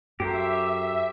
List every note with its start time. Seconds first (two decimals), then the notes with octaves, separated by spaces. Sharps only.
0.20 F#2 F#4 G4 A4 C5 E5 A#5